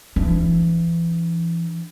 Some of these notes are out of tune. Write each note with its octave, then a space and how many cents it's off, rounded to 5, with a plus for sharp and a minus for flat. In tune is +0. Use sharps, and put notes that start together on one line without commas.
E3 +30 D4 +0